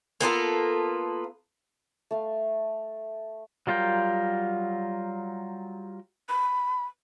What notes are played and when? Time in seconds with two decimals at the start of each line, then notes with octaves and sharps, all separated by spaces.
0.21 A#3 B3 F4 A4
2.11 A3 F5
3.67 F#3 G3 F4 A#4 G5
6.29 B5